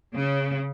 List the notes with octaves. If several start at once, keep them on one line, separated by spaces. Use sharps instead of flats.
C#3